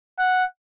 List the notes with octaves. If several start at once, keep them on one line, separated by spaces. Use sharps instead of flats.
F#5